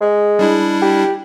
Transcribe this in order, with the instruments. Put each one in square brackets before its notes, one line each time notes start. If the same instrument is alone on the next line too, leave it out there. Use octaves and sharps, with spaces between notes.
[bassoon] G#3
[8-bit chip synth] G3 D4 E4
[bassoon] G4